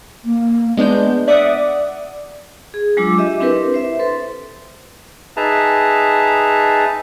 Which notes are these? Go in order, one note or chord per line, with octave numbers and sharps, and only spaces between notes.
A#3
G#3 B3 D4 G6
D5 E5 F#5 D6 D#6
G#4
F#3 G#3 D4 F4 D6 E6
G4 D#5 E5
C4 D4 E4 G4 A#4 B4
C5 E5
A4 B4 C6
D#4 G#4 B4 E5 A5 A#5